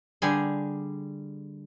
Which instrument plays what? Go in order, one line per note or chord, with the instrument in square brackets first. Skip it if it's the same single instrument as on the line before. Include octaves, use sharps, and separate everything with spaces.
[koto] D3 G3 G#4 G#5